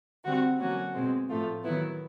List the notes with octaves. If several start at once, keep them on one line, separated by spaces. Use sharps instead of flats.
D3 G3 C4 F#4
D3 F#3 A#3 C#4 F#4
B2 G#3 C4
A2 F3 A3 F4
D#3 F#3 B3 E4